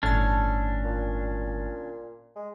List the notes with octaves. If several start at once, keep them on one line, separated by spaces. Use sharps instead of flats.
G1 A2 C#4 D4 A4 A6
A#2
G#3